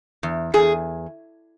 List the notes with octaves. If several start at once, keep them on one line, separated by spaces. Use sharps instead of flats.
E2
E2 G#4